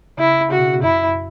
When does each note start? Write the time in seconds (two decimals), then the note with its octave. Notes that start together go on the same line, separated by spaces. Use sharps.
0.18 C#3 E4
0.51 C#3 F#4
0.58 B2
0.67 C#3
0.75 B2
0.83 F#2 E4